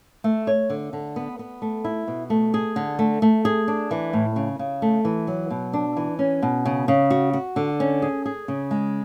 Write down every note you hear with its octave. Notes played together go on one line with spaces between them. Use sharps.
A3
C#5
D3
D3
B3
B3
A3
E4
B2
A3
G#4
D3
A3
A3
G#4
D4
E3
A2
C#3
C#3
A3
E3
F#3
B2
D4
E3
C#4
B2
C#3
C#3
F#4
F#4
D3
C#4
G#4
G#4
C#3
G#3